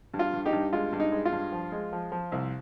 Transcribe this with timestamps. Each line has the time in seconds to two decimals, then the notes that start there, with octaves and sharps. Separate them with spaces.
0.14 G2
0.19 F4
0.33 G2
0.46 D#4 G4
0.53 G2
0.73 G#3 F4
0.92 G2
1.00 D#4
1.12 G#3
1.25 F4
1.32 G2
1.52 F3
1.72 G#3
1.93 F3
2.12 F3
2.32 C2